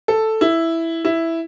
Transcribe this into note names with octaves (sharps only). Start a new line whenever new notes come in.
A4
E4
E4